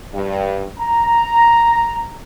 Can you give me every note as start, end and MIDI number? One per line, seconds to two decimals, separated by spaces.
0.14 0.67 43
0.79 2.19 82